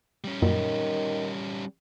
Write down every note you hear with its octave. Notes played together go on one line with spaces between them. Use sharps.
G3 C#4
F#2 A#2 D#3 F#3